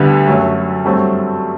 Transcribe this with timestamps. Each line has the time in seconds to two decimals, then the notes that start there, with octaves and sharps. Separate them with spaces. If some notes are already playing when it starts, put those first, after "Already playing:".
Already playing: D2 D3 G3 B3 D4
0.27 F#2 F#3 A3
0.84 G2 F#3 A3 C4